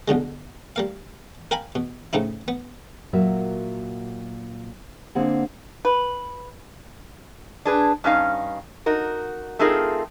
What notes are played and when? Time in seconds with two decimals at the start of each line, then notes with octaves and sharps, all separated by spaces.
0.08 B1 B2 D3 G#3
0.76 G3 A#3 F5
1.51 A#4 F5 G5 G#5 A#5 B5
1.75 B2
2.13 A2 C#3 C4 D#4 E4
2.48 B3
3.13 A#2 F#3 F#4 A#4 E5
5.15 D3 A#3 C4 G#4 F#5
5.85 B4
7.65 D4 G#4 B4
8.04 G2 C#4 D#4 F5
8.86 D#4 F#4 A#4
9.59 A3 C4 D#4 F4 G#4 A#4